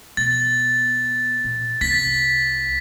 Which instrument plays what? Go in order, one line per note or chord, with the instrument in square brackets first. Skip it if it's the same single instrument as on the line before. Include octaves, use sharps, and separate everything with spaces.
[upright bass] B2 [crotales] A6
[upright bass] A#2
[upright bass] C2 [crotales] A6 B6